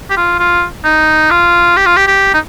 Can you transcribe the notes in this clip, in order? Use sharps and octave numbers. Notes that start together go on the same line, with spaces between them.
G4
F4
F4
D#4
F4
G4
F4
G4
G4
D#4